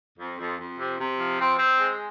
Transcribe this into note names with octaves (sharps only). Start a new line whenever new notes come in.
F2
F2
F2
C3
C3
F3
C4
C4
G#3